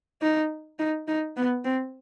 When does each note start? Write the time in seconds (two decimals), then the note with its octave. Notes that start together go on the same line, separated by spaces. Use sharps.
0.22 D#4
0.79 D#4
1.08 D#4
1.37 B3
1.64 C4